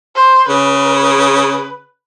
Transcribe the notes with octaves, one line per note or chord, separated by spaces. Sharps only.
C5
C#3 B4